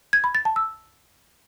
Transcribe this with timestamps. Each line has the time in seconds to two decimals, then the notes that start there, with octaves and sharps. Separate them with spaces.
0.13 G#6
0.24 B5
0.35 A6
0.45 A5
0.56 E6